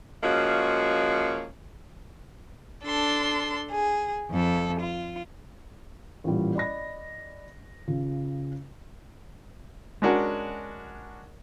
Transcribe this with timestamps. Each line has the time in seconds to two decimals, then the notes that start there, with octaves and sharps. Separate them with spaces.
0.24 F3 G#3 A#3 C#4 F#4
2.84 D4 A4 C6
3.70 G#4
4.31 F2 A4
4.79 F4
6.24 A1 A#2 G3
6.55 D5 D#5 B5 A#6
7.88 C#3 F4
10.02 G#3 C#4 D4 F#4 A#4 F#5